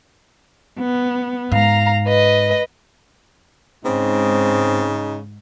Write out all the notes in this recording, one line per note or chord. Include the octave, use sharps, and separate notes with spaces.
B3
G#2 F5 A#5
B4 D#5
G#2 C#3 C4 D#4